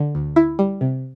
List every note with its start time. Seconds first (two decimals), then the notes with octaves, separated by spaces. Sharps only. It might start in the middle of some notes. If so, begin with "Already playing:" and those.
Already playing: D3
0.15 D2
0.36 E4
0.59 G3
0.81 C3